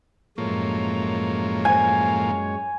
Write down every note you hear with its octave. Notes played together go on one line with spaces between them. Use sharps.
F#2 A2 F3 G#3 A#3 C#5
G#5